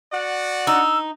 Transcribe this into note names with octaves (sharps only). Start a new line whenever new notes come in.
F#4 D5 F#5
D#4 E6